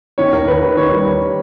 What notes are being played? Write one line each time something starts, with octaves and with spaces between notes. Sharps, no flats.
D#3 C#5
D#2 A#4
D#2 B4
D#2
D#3 C#5
G3
D#2